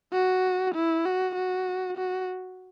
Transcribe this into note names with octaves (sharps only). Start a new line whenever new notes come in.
F#4
E4
F#4
F#4
F#4